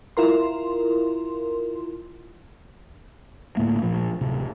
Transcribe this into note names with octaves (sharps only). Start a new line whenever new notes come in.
E4 F4 A#4 C6
D2 A2 A3 A#3
A#2 F3
D1 C3